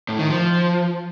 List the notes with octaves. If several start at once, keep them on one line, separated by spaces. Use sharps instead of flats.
A2
D#3
F3